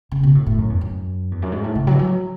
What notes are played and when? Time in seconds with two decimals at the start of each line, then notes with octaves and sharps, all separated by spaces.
0.12 C#3
0.23 B2
0.35 A2
0.47 A2
0.58 F#2
0.70 E2
0.81 F#2
1.32 E2
1.42 F#2
1.52 G#2
1.64 A2
1.75 C#3
1.87 F#3
1.93 E3
1.99 F#3